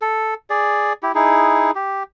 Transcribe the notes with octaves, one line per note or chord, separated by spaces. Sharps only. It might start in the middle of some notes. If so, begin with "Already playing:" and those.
A4
G#4 D5
E4 G4
D#4 E4 G#4
G4